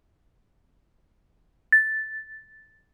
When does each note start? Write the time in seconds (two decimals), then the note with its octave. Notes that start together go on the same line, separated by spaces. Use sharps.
1.72 A6